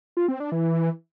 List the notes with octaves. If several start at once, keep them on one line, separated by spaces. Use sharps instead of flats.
F4
C4
D4
E3